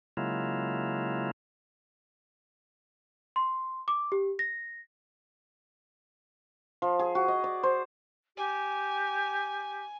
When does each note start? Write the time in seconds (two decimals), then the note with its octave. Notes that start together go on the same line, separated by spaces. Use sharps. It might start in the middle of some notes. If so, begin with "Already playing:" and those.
0.17 C#3 F#3 G#3 A#3 E4 F4
3.36 C6
3.88 D6
4.12 G4
4.39 A#6
6.82 F3
6.99 G#4
7.15 F#4
7.28 D#5
7.44 D5
7.63 C5
8.37 G4 G#5